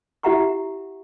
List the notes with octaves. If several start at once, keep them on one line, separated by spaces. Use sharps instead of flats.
E4 G4 E5 F#5 A#5 C#6